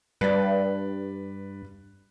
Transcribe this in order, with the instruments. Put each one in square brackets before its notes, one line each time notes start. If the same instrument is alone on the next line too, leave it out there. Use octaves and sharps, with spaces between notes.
[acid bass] G2 [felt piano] B4 D5